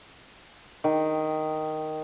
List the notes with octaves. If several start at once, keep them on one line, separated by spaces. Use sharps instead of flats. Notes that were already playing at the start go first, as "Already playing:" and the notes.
D#3